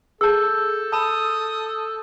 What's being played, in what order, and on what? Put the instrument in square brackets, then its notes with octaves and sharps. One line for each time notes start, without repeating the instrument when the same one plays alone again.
[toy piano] G#4 A5 [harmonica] A4 [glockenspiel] E6 G6
[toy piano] A5 B5 [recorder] D#6